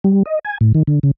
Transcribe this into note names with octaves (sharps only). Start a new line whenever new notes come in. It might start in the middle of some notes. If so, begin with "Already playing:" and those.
G3
D#5
G#5
A2
D#3
D3
C#3